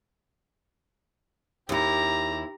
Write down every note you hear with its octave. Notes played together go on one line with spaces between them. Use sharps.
D#2 E4 G4 A#5